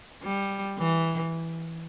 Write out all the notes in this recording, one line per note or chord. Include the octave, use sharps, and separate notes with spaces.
G3
E3